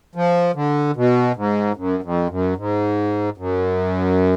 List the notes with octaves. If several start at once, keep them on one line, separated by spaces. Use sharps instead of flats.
F3
D3
B2
G#2
F#2
F2
F#2
G#2
F#2